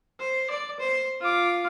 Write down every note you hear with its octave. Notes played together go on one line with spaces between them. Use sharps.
C5
D5
C5
F4 D6